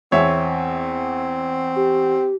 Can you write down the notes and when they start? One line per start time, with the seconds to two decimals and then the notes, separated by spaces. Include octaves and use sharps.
0.12 E2 C4 C#5 E5
1.76 G4